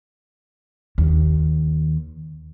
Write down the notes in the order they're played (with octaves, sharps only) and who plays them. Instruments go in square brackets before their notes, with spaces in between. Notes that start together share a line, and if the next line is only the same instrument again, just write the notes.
[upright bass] D#2